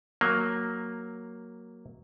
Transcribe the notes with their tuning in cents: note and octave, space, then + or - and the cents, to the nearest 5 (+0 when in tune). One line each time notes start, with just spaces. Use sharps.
F#3 +0 A#3 +0